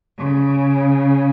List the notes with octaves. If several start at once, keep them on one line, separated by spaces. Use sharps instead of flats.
C#3